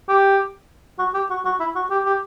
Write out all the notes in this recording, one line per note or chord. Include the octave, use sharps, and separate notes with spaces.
G4
F#4
G4
F#4
F#4
E4
F#4
G4
G4